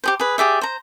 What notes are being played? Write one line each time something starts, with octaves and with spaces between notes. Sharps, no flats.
G4 G#4 C5
G#4 B4
G4 G#4 D5 E5
C5 A#5